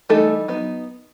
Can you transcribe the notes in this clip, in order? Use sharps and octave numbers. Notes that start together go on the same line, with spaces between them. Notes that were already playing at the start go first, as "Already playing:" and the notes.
E3 G3 A3 D#4 A4
F#3 B3 D#4